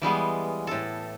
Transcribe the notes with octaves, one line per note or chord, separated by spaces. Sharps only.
E3 G3 G#3 B3
A2 A4